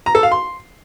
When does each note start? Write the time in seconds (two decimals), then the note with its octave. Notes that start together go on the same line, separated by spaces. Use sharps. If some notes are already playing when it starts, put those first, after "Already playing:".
0.06 A#5
0.15 A4
0.23 F5
0.32 C6